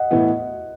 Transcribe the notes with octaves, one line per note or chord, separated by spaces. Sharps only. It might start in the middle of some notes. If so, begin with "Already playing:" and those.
Already playing: D#5 F#5
A2 E3 B3